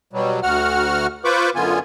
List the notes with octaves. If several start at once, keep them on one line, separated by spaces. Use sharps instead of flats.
B2 F#3 G3
D2 F#4 F#5 F6
F4 B4 C5 B5 C#6 D6
F#2 D3 B3 F4 G#5